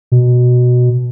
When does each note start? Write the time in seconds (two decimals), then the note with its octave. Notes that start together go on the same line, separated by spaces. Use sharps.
0.12 B2